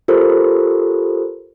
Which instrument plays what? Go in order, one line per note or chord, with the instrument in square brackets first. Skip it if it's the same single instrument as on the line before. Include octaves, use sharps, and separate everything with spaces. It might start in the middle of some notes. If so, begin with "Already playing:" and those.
[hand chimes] F4 G4 A4 A#4 C5